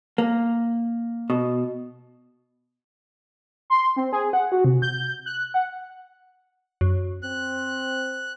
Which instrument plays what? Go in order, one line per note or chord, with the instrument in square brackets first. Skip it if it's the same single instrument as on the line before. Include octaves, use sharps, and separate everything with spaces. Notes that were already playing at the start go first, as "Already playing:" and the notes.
[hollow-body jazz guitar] A#3
B2
[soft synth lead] C6
C4
G#4
F#5
F#4
C3
G6
F#6
F#5
[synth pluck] F#2
[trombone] C4 [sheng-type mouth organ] F#6